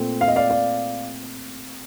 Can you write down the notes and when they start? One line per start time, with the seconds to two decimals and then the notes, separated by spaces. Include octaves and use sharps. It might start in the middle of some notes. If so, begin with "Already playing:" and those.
Already playing: A#2 A3 C4
0.21 F5
0.28 D#5
0.36 D5 F5
0.50 D5 F5